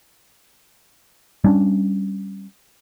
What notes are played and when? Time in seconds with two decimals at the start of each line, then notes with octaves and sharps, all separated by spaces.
1.44 G3 C#4 D4